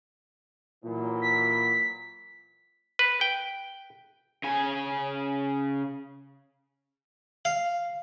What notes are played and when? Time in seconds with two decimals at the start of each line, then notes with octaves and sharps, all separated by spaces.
0.84 A#2 E3 F#3
1.22 B6
2.99 B4
3.21 G5
4.43 C#3 G#5
7.45 F5